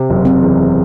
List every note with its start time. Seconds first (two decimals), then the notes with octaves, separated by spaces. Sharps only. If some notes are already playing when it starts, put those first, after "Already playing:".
Already playing: C3
0.10 F#1
0.25 C4
0.41 E2